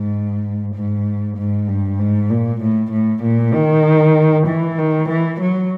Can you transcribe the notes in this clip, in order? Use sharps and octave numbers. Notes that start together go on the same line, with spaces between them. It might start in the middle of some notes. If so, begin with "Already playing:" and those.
Already playing: G#2
G#2
G#2
G2
G#2
A#2
A2
A2
A#2
D#3
E3
D#3
E3
F#3